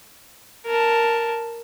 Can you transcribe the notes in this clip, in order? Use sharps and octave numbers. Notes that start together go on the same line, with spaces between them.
A#4 A5